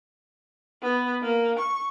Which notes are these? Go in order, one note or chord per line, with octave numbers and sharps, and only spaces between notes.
B3
A#3
C#6